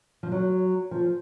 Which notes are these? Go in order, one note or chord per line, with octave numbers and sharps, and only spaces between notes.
F3
F#3
F3